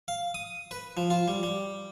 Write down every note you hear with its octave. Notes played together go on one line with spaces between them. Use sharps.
F5
D#6
B4
F3
F4
G3
G3